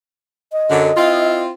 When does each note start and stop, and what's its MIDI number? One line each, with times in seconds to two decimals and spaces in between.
0.52 1.42 75
0.70 0.91 42
0.70 0.91 50
0.96 1.50 60
0.96 1.50 64
0.96 1.50 65